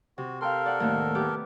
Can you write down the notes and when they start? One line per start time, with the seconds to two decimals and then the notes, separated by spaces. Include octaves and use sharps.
0.18 C3 F#4
0.41 A4 A#4 F5 G5 C6
0.66 D5 F#5
0.80 D#2 A2
1.15 B3 G4 D6